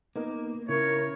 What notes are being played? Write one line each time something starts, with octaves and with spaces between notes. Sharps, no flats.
A#3 B3 D#4 A#4
C#3 E4 A#4 C#5